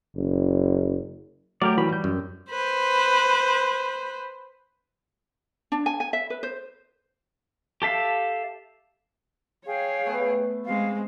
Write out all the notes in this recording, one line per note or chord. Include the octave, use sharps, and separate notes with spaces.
F#1
F#3 A3 G4 A#4 D5
E3 G3 F#4 B5
G6
F#2
B4 C5
D4
G#5
G#5
E5
B4
C5
G4 A4 E5 F5
G#4 C#5 F5 G5
A3 B3
G#3 C4 F5